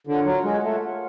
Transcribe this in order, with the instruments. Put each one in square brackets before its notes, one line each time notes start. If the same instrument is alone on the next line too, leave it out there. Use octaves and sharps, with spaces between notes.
[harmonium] D3 [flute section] F4 A#4 C#5 F#5
[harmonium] F#3
G#3
A3
[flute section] F4 A#4 C#5 F#5